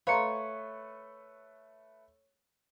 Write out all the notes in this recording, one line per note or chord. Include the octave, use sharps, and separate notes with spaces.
A3 B4 C#5 F5 A#5 C6 C#7